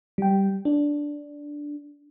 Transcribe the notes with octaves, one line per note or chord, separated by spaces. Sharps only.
G3 G5
D4